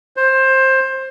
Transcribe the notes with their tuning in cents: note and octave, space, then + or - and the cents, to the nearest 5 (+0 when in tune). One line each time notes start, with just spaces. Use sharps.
C5 +15